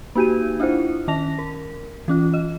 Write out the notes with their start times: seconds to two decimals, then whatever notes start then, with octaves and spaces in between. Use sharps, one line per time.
0.15 A#3 D#4 F#4 G4 D#7
0.60 D4 E4 F4 C5
1.08 D#3 C#4 A5 A#6 F7
1.38 A#4
2.08 E3 C#4 F4
2.34 D#5